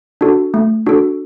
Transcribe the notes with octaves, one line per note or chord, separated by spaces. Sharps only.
D4 F#4 A4
A3
D4 F#4 A4